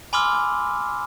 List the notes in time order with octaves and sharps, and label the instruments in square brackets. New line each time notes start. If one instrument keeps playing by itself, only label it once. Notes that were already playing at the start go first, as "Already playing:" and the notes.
[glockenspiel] G#5 B5 C6 D6 E6 F6